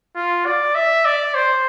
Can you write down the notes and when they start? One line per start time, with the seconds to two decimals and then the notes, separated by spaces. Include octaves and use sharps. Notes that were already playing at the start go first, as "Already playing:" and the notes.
0.16 F4
0.46 D5
0.75 E5
1.05 D5
1.35 C5